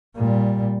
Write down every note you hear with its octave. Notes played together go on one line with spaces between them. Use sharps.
A#2 G3